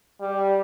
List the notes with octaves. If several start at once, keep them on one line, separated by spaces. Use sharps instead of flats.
G3